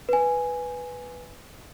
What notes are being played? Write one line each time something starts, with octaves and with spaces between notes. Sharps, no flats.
B4 G#5